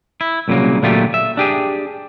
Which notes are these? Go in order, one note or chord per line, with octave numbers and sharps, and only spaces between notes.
E4
C2 A#2 C#3 F#3 A#3
A#2 D3 F#3 A3 F4 G4
E5
D4 G4 G#4